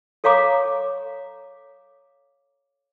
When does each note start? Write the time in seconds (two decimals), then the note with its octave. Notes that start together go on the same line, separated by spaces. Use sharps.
0.24 A4 C#5 F5 A#5 D6